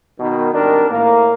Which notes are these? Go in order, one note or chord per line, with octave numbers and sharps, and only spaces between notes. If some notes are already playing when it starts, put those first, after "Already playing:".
B2 D#3
G#1 D#3 G3 D4 A#4
A2 A#3